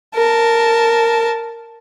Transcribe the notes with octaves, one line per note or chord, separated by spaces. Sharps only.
A#4 A5